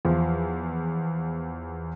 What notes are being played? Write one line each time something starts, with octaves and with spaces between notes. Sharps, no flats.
E2 F3